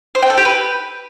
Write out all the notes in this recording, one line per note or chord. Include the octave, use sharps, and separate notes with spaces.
C5
G5
A4
G4
B4